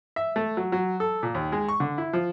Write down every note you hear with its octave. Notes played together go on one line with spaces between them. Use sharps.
E5
A3
F#3
F#3
A4
A#2
D#2
G#3
C#6
D3
E4
F3